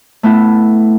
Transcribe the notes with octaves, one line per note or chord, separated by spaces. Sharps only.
A3 B3 E4